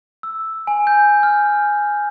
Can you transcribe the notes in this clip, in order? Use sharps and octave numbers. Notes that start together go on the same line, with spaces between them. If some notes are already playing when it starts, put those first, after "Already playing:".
E6
G#5
G6
F6